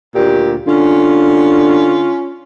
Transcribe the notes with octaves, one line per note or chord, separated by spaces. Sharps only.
D2 A#2 G4
D3 C#4 F4